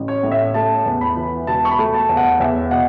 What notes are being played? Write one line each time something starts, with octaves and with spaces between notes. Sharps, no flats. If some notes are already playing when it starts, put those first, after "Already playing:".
Already playing: A1
C#5
A2
E5
A3 A5
E2
B5
E3
E1 A5
C#6
B5
A3
A5
E2
F#5
E2 E5
B2 F#5